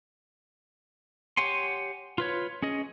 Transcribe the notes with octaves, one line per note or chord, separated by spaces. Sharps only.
G4 C#5 F#5 G#5 C6
F4 B4 C#5
C#4 G#4 D#5